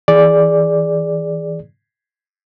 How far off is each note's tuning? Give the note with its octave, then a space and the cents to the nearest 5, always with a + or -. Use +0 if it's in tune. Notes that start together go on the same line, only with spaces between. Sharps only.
E3 -15 G#4 +0 D5 +0